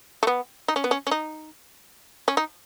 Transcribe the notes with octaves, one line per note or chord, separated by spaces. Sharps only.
A3
B3
D#4
C#4
B3
C#4
C#4
D#4
C#4
D#4